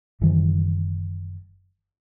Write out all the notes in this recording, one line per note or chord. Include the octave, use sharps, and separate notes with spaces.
F#1 D#3 E3 G3